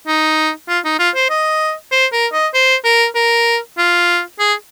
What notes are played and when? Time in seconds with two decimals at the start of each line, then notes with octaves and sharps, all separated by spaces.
0.07 D#4
0.68 F4
0.85 D#4
0.99 F4
1.15 C5
1.30 D#5
1.92 C5
2.12 A#4
2.33 D#5
2.54 C5
2.85 A#4
3.15 A#4
3.78 F4
4.39 G#4